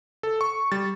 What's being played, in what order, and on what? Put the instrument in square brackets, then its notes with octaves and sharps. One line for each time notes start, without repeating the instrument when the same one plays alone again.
[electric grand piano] A4
C#6
G3 A6